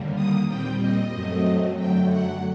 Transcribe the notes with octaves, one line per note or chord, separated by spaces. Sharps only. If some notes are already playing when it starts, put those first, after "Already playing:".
Already playing: D#2 D3 G3 A#3
D#6
A#2 G3 C4 G5
D#5
F#2 F#3 A3 C4
F#2 D3 F#3 A3 G5
F#5